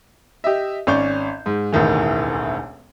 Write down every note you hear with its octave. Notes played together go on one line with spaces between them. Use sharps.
G4 D#5 E5
G#1 C#4 D5 C#6 G6
G#2
E1 A1 D2 D#3 E3